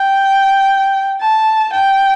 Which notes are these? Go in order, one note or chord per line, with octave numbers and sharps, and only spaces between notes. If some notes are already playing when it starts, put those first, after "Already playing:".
Already playing: G5
A5
G5